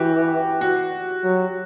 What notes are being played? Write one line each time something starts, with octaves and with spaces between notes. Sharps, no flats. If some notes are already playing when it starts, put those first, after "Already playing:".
Already playing: E3 F#4 G4
F#4
F#3